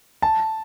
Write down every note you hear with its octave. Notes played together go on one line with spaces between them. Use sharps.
A5